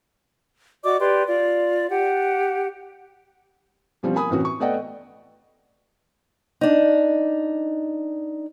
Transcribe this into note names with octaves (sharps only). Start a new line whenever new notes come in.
F#4 D5 D#5 D6
G4 B4 D5 C6
F4 D5
G4 F#5
B2 F3 G3 C4 C#4
A#3 G#5 B5 D#6
A2 C3 E3 C4 C#4 F#4
C#6
A3 B3 D5 D#5 F#5 G5
D4 D#4